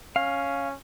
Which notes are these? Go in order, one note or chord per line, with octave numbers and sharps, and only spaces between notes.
C#4 F5